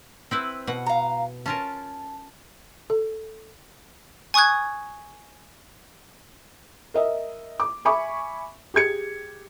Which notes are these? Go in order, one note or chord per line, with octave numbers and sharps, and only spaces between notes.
C4 E4 B4
B2 F#5
F5 A#5
C#4 F4 A#4 A5
A4
G#5 C#6 D#6 F#6 G#6
A#4 D#5 E5
D6
E5 G#5 B5 C#6 D6
G4 G#4 G#6 C#7